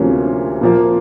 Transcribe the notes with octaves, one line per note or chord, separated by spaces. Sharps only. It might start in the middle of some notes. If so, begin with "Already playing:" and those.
Already playing: D2 C3 F3 A#3 C#4
A#2 F3 A#3